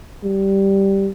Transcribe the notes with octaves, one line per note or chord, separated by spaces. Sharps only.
G3